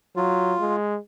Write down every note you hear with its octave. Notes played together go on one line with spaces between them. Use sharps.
F#3 F4
G#3